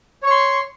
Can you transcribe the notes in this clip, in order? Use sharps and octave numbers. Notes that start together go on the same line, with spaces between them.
C#5 C6 C#6